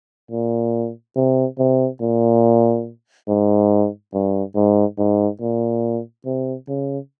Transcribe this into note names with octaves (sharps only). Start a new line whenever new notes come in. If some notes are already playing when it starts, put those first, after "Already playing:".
A#2
C3
C3
A#2
G#2
G2
G#2
G#2
A#2
C3
C#3